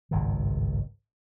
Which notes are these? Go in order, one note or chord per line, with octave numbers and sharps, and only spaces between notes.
G#1 C#2 G2 D#3